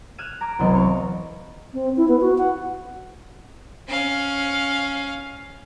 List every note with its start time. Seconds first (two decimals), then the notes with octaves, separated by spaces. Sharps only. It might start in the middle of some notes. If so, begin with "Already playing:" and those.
0.18 F6 F#6 G#6 D#7 E7
0.41 A#5 D6 G#6
0.59 E1 C2 F#3 B3 D#5 C6
0.74 F5 C#6
1.74 C4
1.97 E4
2.08 B3
2.21 F#4
2.38 F#5
3.88 C#4 F5